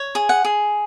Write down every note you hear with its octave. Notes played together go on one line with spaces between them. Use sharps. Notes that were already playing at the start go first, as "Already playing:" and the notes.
Already playing: C#5
G#4
F#5
G#4